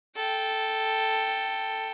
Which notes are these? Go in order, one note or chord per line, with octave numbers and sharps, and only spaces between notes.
A4 G5